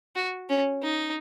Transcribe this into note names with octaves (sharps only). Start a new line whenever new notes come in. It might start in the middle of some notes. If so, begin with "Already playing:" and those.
F#4
C#4
D#4